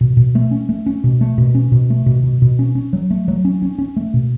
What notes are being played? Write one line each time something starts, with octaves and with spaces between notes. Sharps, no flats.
B2
B2
A3
C#4
A3
C#4
B2
A3
B2
C#4
B2
A3
B2
B2
B2
C#4
C#4
F#3
A3
F#3
C#4
C#4
C#4
A3
B2